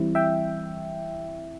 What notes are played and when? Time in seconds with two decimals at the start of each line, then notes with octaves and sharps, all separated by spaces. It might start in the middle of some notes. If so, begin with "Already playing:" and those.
Already playing: E3 G3 C4 E4
0.15 E5 G5